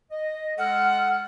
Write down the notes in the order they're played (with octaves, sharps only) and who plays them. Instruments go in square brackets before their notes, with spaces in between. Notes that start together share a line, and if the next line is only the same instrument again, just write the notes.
[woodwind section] D#5
[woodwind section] G#3 A4 F6 [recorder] F#5